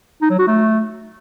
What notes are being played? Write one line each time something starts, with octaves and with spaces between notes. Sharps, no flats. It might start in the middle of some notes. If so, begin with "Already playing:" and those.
D#4
F#3
F#4
A3